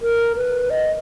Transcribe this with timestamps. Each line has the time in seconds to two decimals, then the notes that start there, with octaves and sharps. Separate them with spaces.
0.02 A#4
0.37 B4
0.70 D#5